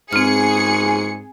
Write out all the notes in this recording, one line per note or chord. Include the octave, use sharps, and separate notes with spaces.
G#2 C4 G#4 F6 C#7